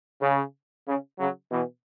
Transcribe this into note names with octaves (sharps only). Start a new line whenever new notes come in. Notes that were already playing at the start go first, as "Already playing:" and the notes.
C#3
C#3
C#3 F#3
B2 E3